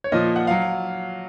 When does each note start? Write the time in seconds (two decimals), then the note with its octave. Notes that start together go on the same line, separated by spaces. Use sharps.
0.04 C#5
0.12 A#2 F3 D#5
0.36 F#5
0.47 F#3 F5